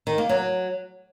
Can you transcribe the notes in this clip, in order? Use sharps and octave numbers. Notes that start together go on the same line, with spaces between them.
D#3
A#3
F#3